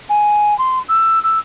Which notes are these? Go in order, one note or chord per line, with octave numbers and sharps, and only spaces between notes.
G#5
C6
E6
E6